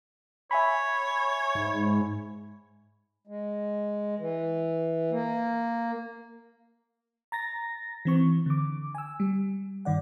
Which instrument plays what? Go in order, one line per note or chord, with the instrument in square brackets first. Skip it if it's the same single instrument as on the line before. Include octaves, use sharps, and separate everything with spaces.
[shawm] C#5 [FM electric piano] E5 G#5 B5
[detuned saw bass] G#2
[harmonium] G#3
E3
A#3
[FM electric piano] A#5 A6 A#6
E3 C4 C#6
D3 D6
G#5 E6
G3
G2 D#3 D5 F#5